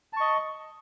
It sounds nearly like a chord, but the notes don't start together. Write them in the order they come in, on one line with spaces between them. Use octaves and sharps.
A5 C#6 D#5